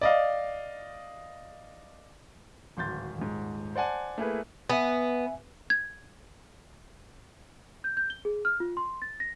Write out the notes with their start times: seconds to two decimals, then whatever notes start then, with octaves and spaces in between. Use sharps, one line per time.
0.01 D5 D#5 F5
2.77 D1 G#1 C6 G6 A6
3.18 D#1 G#2
3.76 C5 D5 F#5 G#5 A5
4.18 A3 A#3 E4 G#4 B4
4.70 B3 E5 G#5
5.70 G#6
7.84 G6
7.97 G6
8.10 G7
8.25 G#4
8.45 F6
8.60 F4
8.77 C6
9.02 A6
9.20 A#6